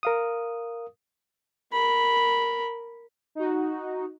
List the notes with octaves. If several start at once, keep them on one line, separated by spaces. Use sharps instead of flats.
A#4 F5 D#6
A#4 B5
D#4 F#4